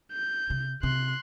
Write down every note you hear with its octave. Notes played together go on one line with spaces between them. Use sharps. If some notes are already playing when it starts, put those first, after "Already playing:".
G6
C3
C3 C6 F#6